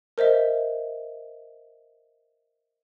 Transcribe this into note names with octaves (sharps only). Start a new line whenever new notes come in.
A#4 C5 D#5 E5